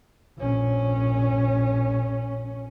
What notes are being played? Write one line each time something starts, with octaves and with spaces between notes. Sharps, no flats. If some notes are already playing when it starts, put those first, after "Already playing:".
A#1 C#4